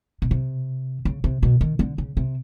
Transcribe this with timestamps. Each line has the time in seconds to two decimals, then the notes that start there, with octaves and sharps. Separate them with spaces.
0.22 B2
0.31 C3
1.05 C#3
1.24 C3
1.43 B2
1.61 D#3
1.79 D3
1.98 C#3
2.17 C3